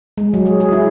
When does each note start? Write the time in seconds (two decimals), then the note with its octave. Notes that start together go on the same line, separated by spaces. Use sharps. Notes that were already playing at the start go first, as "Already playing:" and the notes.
0.18 G#3
0.34 F#3
0.46 G#4
0.60 G#4
0.72 E4